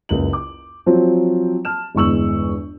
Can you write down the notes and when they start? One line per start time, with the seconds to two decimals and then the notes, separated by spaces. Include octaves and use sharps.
0.09 F#1 C#2 F#7
0.33 D6
0.86 F3 F#3 C4
1.65 A5 F6 E7
1.95 G1 E2 G#3 C#6 E6 F#7